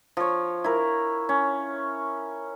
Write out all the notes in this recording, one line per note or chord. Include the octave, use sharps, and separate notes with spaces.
F3 C#5
E4 A#4
C#4